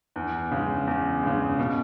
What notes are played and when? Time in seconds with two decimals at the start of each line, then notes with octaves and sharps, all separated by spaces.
0.16 E2
0.51 C#3 G#3
0.87 E2
1.23 C#3 G#3
1.59 B2